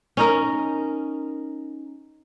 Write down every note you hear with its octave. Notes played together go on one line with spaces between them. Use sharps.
C#4 D#4 A#4